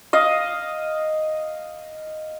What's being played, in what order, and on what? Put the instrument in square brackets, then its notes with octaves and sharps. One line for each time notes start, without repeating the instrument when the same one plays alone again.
[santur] D#5 F5